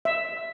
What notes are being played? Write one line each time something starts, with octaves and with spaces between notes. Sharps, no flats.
E5